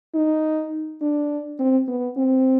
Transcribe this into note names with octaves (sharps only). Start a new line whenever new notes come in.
D#4
D4
C4
B3
C4